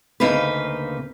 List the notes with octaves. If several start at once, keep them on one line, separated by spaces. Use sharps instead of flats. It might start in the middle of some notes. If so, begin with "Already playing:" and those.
D2 C#3 A#3 D#4 B4